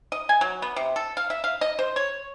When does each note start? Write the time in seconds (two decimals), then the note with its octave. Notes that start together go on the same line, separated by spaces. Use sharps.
0.12 D#5
0.29 G#5
0.41 F#3
0.62 B3
0.76 C3
0.96 A4
1.17 F5
1.30 E5
1.44 F5
1.61 D#5
1.79 C5
1.96 C#5